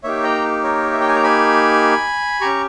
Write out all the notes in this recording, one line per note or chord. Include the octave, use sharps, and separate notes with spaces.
A#3 D#4 G4 C#5 E5
G5 A#5
A#4 C#5
E5
G5
G#5
A#5
G#5 B5
C#4 G4 A#5 C#6